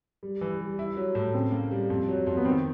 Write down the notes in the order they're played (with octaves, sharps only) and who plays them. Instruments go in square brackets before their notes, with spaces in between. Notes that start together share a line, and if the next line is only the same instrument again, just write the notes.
[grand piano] G3
E3
G3
E4
F#3
A2
[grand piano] C#3 [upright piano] C4
[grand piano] A#3
G3
F2
F#3
F2
[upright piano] B3
[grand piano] D#3 [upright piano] C4